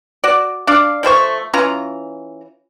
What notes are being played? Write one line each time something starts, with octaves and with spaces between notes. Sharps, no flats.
F#4 D5
D4 D5 F5
F3 A3 C5 C#6
E3 C#4 F4 A#5